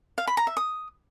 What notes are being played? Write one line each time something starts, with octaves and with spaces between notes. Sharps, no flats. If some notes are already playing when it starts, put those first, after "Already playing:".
F5
B5
A#5
E5
D#6